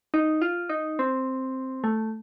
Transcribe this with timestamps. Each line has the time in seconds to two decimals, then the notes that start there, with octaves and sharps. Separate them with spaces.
0.14 D#4
0.42 F4
0.69 D#4
0.99 C4
1.84 A3